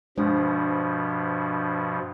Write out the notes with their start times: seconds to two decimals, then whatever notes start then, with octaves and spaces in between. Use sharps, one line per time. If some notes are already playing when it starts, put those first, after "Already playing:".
0.18 G2 B2 F3 G#3 D4 C5